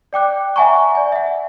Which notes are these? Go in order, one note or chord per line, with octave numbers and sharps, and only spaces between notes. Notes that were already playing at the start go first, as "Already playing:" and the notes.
D5 G5 D6 F#6
E5 F#5 G#5 A#5 C#6
D5 G#5
E5 F#5